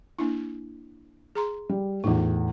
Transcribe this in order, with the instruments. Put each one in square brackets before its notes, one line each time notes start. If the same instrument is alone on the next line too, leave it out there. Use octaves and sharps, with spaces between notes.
[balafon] A#3 D4 E4
G#4 A#5 C6
[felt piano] G3
[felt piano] E2 A2 [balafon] D#4 F4